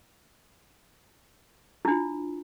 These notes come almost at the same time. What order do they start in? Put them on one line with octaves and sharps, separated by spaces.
E4 D4 F4